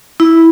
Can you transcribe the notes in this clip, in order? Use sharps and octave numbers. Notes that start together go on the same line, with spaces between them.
E4